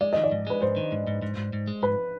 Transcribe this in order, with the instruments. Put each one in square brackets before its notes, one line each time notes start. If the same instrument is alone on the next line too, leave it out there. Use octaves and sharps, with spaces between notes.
[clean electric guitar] G#3 [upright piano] D5
[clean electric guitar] D#3 [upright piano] D#5
[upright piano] D5
[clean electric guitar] G#2
[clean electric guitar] G#3 [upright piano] B4
[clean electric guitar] G#2 [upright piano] C5
[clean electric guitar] D#3
G#2
G#2
G#2
G#2
G#2
G#3
[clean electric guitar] G#2 [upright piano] B4